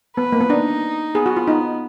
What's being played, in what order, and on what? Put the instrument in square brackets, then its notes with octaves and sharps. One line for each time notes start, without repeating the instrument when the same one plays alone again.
[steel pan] B3 [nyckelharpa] B4
[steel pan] A#3
B3
[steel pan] D4 [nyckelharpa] D#4
[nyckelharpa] B3 [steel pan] G#4
[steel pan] F#4
F4
D#4